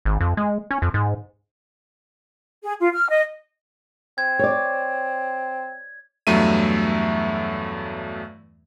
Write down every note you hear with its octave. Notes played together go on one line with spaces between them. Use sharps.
G#1
F2
G#3
C#4
F2
G#2
G#4
F4
F6
D#5
C4 G#6
C#5 D5
E2 G2 F#3 A3 E5 D#7